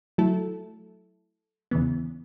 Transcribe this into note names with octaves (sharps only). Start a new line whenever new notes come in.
F#3 A3 E4 A4
E2 C#3 E3 B3